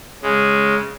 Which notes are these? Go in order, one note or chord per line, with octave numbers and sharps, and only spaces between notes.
C#3 G#3